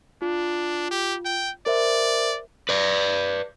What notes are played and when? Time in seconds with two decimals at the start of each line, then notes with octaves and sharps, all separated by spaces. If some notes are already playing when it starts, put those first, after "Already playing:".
0.22 D4 F4
0.91 G4
1.25 G5
1.66 A#4 C5 D5 E5
2.69 B4 D5